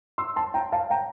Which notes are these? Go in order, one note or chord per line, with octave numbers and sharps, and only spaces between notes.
C6 E6
A5 C6
G5 A#5
F5 A5
G5 A#5